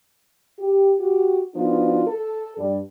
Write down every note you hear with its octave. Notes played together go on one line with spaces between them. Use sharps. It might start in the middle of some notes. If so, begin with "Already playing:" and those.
G4
F#4 G4
F3 B3 D4 D#4 F4 F#4
A4
G2 G3